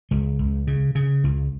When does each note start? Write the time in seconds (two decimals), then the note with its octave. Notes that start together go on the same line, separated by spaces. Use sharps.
0.11 C#2 G#3
0.39 C#2
0.67 C#3
0.95 C#3
1.24 C#2